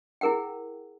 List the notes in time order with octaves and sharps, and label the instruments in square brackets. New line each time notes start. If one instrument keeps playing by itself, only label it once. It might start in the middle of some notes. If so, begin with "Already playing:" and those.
[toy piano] E4 G#4 A#4 F#5 G5